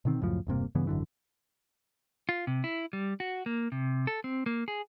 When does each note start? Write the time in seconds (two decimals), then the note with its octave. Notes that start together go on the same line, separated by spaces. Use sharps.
0.05 B2 D3 D#3 C4
0.21 C#2 F#2 A2 F3
0.47 E1 G2 C3 A#3
0.75 G2 C#3 E3 B3
0.87 G#1 F#2 D3 E3
2.29 F4
2.47 C3
2.64 E4
2.93 G3
3.20 F#4
3.46 A#3
3.72 C3
4.07 A4
4.24 C4
4.46 A#3
4.68 G#4